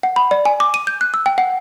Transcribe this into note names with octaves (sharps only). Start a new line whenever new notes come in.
F#5
B5
D5
G#5
D6
D#7
G6
F#6
E6
G5
F#5